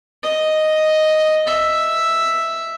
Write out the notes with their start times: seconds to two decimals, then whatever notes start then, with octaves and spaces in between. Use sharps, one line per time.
0.23 D#5
1.47 E5